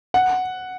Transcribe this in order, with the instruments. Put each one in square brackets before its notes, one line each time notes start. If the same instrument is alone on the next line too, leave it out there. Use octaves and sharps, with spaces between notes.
[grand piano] F#5